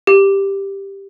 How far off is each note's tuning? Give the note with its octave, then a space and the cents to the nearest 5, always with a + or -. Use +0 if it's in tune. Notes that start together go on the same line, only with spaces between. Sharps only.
G4 +5